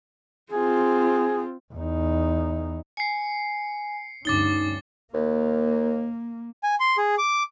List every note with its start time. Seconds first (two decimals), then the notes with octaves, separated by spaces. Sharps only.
0.51 C4 F4 G#4
1.74 E2 D#4
2.97 G#5 C7 C#7
4.25 D2 G2 C#4 D#4 D6 A6 G7
5.13 D#2 A#3
6.63 G#5
6.80 C6
6.97 G#4
7.18 D6